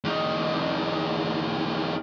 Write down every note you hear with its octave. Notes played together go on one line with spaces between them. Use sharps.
E2 D#4